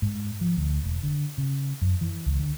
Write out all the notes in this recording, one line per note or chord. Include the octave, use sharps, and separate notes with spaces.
G#2
F3
D2
E1
D3
C#3
F#2
E3
C#2
D3